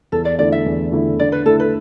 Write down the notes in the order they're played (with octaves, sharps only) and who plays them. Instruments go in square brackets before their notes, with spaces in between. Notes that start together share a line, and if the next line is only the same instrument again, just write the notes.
[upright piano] E2 [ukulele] A4
[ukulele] D5
[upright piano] D3 A3 E4 [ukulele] D5
[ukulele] E5
[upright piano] E2
D3 A3 E4
[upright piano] D3 [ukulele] D5
[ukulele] B4
[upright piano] A3 E4 [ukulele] A4
[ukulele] B4